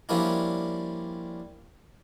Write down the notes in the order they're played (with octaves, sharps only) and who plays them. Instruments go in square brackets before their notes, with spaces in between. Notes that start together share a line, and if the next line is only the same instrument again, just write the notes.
[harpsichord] F3 G3 A#3 C#4 D4 E4